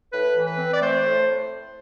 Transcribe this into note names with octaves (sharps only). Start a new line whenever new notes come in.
A2 B4
E3
B4
C4
D5
A3 C5
A2